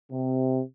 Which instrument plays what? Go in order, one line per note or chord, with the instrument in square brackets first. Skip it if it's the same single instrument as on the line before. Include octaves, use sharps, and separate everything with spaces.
[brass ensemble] C3